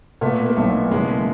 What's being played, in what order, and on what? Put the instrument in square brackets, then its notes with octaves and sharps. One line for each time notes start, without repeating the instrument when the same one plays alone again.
[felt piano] A#2 [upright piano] A3 B3
[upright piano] A#3
[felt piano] B1 [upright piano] A3 B3
[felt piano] F#1 [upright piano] G#3 A#3